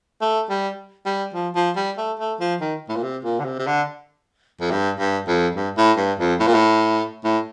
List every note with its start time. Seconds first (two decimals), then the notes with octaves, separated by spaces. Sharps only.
0.21 A3
0.50 G3
1.06 G3
1.34 F3
1.55 F3
1.76 G3
1.98 A3
2.19 A3
2.40 F3
2.60 D#3
2.89 A2
2.96 A#2
3.03 C3
3.24 A#2
3.40 D3
3.44 C3
3.59 C3
3.67 D3
4.60 F2
4.71 G2
4.99 G2
5.28 F2
5.55 G2
5.77 A2
5.97 G2
6.19 F2
6.40 A2
6.47 A#2
6.54 A2
7.24 A2